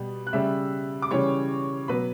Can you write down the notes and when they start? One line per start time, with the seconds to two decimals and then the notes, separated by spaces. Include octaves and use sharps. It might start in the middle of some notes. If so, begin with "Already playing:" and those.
Already playing: B2 G3
0.27 F#6
0.33 C#3 G3 E5 E6
1.02 D6
1.11 C#3 E3 G3 C#5 C#6
1.88 B2 F#3 B4 B5